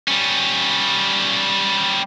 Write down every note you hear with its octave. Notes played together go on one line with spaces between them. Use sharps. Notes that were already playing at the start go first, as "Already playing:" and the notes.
G3 C#4